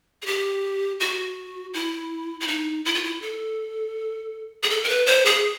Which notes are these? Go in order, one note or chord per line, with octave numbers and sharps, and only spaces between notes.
G#4
G4
F#4
E4
E4
D#4
E4
F4
E4
A4
G#4
A4
A#4
B4
C5
G#4